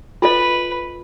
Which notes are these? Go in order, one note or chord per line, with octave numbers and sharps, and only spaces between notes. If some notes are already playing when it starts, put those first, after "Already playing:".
F4 A4 B4 D#5